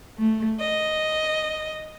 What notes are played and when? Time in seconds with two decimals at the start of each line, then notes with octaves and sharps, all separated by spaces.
0.19 A3
0.60 D#5